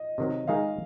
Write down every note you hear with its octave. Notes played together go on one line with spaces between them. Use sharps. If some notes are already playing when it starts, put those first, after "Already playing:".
Already playing: D#5
C3 D#3 F#3
D#3 G#3 D#4 G#4 F5